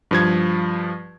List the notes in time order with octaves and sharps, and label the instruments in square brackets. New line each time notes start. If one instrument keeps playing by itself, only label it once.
[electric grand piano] G2 F3 G#6